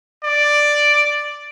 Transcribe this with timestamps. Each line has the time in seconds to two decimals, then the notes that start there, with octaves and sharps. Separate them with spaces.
0.24 D5